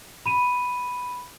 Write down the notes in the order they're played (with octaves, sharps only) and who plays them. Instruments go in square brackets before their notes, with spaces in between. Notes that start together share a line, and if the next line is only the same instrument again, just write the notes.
[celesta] B5 D#7